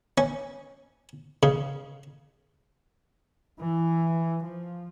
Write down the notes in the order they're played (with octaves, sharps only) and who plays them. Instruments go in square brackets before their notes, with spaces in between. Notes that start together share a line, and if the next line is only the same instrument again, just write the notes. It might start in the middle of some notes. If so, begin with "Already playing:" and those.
[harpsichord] C#4
C#3
[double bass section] E3
F3